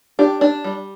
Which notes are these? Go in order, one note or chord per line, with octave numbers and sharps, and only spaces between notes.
D4 G4
D4
G3